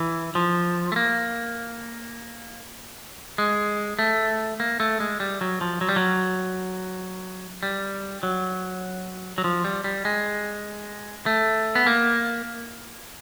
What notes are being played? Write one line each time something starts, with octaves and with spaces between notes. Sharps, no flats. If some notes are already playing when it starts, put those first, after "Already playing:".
Already playing: E3
F3
A3
A#3
G#3
A3
A#3
A3
G#3
G3
F#3
F3
F#3
G3
F#3
G3
F#3
F#3
F3
G3
G3
G#3
A3
B3
A#3